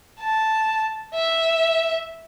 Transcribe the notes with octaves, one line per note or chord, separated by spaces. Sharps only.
A5
E5